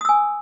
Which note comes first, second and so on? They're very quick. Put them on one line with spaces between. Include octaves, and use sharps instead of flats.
D#6 E6 G#5